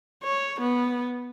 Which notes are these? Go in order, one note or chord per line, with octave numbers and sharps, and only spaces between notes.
C#5
B3